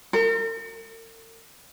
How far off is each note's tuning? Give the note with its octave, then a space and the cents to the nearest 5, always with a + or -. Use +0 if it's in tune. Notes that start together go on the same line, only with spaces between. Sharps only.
A#4 -45